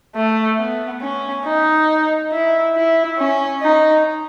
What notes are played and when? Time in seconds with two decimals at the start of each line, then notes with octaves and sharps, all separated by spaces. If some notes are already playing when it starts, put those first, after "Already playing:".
0.16 A3
0.59 B3
1.01 C#4
1.45 D#4
2.32 E4
2.76 E4
3.18 C#4
3.62 D#4